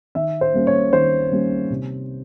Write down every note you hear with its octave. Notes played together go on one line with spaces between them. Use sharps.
D#3 E5
C5
G3 A#3 C#4
C#5
D#3 C5
G3 A#3 C#4
C3